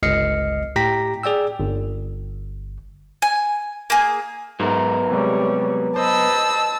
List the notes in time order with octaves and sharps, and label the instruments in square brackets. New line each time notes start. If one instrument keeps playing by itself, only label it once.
[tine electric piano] G1 C#2 D#5 F6 C7 C#7
A2 G4 G5 A#5 A#6 B6
G#4 D5 G5 E6
G1
[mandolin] G#5
A#3 G#4
[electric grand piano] G#2 [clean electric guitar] F#3 B3 A#4
[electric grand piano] C3 G#3 [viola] G3 C#5
[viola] B4 D#5 [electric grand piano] C5 [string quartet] A5 E6